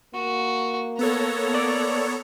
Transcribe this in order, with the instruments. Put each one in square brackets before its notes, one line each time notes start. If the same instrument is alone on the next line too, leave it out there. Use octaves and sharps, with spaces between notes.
[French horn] A#3 [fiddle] F#4
[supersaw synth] B3 A4 C#5 [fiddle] A#5
[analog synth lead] D5